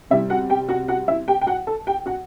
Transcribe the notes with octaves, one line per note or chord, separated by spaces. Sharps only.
C3 G3 E4 E5
F#4 F#5
G4 G5
F#4 F#5
F#4 F#5
E4 E5
G4 G5
G5
F#4 F#5
A4 A5
G4 G5
F#4 F#5